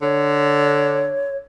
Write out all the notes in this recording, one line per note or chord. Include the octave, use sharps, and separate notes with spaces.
D3 C#5